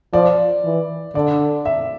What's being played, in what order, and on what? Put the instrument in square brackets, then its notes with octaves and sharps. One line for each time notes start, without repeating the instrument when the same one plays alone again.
[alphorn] F3 [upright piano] D5
[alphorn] E3
[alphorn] D3 [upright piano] D5
[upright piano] E5